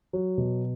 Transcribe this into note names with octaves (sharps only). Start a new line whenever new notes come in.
F#3
B2